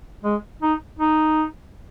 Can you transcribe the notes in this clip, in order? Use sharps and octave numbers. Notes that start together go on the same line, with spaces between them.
G#3
D#4
D#4